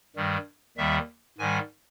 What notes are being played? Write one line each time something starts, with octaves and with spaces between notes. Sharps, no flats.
G2 D#3 G3
D#2 D#3 G3 E5
G#2 D#3 G3 G#5